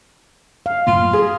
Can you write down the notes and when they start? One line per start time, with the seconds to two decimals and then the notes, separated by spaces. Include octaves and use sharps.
0.66 F5
0.87 F#2 A2 A#3 F4
1.13 G2 G#4